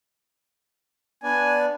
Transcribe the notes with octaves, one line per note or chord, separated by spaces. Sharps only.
B3 D4 D5 G#5